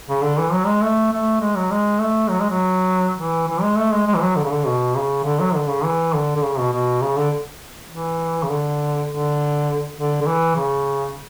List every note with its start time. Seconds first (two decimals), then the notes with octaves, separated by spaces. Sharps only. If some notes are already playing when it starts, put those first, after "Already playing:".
0.09 C#3
0.23 D3
0.38 E3
0.52 F#3
0.67 G#3
0.82 A3
1.12 A3
1.41 G#3
1.56 F#3
1.71 G#3
2.00 A3
2.30 F#3
2.40 G#3
2.50 F#3
3.18 E3
3.48 E3
3.62 G#3
3.78 A3
3.92 G#3
4.07 G#3
4.15 E3
4.21 F#3
4.36 D3
4.44 C#3
4.51 D3
4.66 B2
4.95 C#3
5.24 D3
5.40 F#3
5.55 D3
5.69 C#3
5.84 E3
6.13 D3
6.36 D3
6.43 C#3
6.58 B2
6.73 B2
7.01 C#3
7.17 D3
7.91 E3
8.43 C#3
8.50 D3
9.09 D3
9.98 D3
10.21 D3
10.27 E3
10.56 C#3